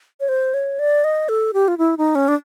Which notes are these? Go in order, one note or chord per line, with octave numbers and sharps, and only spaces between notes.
C#5
C5
C#5
D5
D#5
A4
G4
F4
E4
D#4
C#4
D4